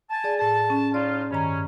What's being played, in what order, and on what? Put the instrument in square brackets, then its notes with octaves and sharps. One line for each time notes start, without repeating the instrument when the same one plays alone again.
[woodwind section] G#5 A5
[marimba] G#4 D5
[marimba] A2 G#4 [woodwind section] A5
[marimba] C#4
[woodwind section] A2 D#4 F4 [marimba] D5
[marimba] G2 D#3 A#5 [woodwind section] C#4